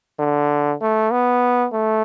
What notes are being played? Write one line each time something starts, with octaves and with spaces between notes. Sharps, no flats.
D3
A3
B3
A3